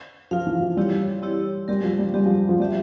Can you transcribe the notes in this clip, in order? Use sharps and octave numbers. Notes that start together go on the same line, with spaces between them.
F3 F4 A#4 F5
E3
F3
G3 C4 E4 G4 C#5
C4 E4 G4 C#5
G3 G#3 C4 G4 A#4
F3
G3
G3 G#3 C4 G4 A#4
F3
F3
G3 C4 G4 C5 E5